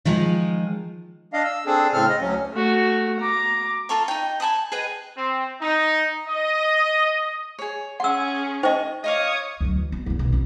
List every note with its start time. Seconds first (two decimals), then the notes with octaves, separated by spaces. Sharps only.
0.05 D#3 F3 G#3
1.33 D4 D#5 F5
1.45 E6
1.66 C4 D4 G#4 A4
1.93 A2 C#3 C4 A4 F6
2.09 D#5
2.21 D2 F#3 C#4
2.53 A3 F#4
3.19 A#5 D6
3.89 F4 A4 A#5 C#6
4.08 D#4 G5
4.40 G#5 A5 B5 D#6
4.72 G#4 B4 D#5 G5
5.17 C4
5.61 D#4
6.28 D#5
7.59 G#4 C#5
8.00 C#4 G#4 F#5 C6 E6
8.63 D#4 C5 D#5 G5 C#6
9.04 C#5 D#5 F5 D6 D#6
9.61 D2 F#3
9.76 E3
9.92 B3
10.06 E2 C#3
10.19 B1
10.32 C4 C#4